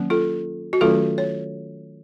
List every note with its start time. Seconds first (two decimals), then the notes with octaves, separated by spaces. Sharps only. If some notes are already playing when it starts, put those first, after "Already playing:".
Already playing: D#3 F#3 A#3 C#4
0.10 F4 A4
0.73 F#4
0.81 D#3 F#3 A3 C#4 F4 A4
1.18 C#5